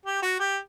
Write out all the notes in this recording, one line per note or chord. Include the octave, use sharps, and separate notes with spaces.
G4
F#4
G4